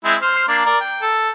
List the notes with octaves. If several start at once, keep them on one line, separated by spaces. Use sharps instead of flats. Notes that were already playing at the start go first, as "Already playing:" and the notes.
G#3 C4 E4
C5 C6 F6
A#3 D4 D5
A#4 D5
G5
A4